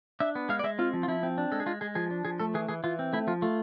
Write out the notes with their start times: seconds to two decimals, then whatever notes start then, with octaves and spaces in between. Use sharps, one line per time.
0.20 D4 E5
0.35 B3
0.49 G#3 F5
0.59 D5
0.64 G#3 E5
0.79 C4 F4
0.93 F3
1.03 F4
1.08 F3 E4
1.23 C4
1.38 D4
1.52 G#3 A4
1.60 G#4
1.66 G#3 F4
1.81 G#3 G#4
1.95 F3 G#4
2.11 D4
2.25 F3 G#4
2.40 A3 A4
2.54 E3 G#4
2.68 E3 G#4
2.84 E3 F4
2.99 C4
3.13 A3 E4
3.27 F3 F4
3.42 A3 F4